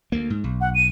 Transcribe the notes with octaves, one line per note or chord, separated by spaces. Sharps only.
D2 A#3
G#2
B1
F#5
D#7